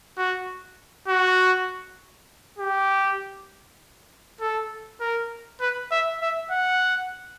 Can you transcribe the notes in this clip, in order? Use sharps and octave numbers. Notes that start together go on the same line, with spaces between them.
F#4
F#4
G4
A4
A#4
B4
E5
E5
F#5